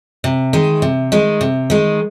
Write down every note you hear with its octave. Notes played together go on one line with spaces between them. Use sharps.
C3
D#3 G#3
C3
D#3 G#3
C3
D#3 G#3